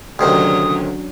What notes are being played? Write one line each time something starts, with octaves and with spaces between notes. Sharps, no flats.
D2 C3 D#3 F#3 C#4 D4 D#6